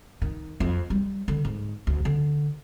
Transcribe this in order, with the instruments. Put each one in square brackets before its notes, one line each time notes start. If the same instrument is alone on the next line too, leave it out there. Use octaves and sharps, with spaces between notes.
[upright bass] D#3
F2
G3
D3
G#2
D2
D3